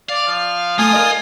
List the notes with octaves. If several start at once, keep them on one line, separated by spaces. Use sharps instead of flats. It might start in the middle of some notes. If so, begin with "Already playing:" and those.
D5 F5
F3
A3 F4 G#5 D#6
A#4 D5 D#5